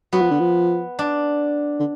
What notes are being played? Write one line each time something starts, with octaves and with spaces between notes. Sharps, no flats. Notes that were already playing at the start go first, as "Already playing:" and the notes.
F#3 B3
F3
D3
F3
D4
D3